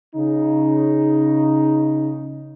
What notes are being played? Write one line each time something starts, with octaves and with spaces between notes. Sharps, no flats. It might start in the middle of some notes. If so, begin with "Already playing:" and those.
C#3 D#4